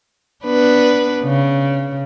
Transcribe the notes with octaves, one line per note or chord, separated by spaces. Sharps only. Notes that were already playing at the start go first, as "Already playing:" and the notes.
B3 D4 B4
C#3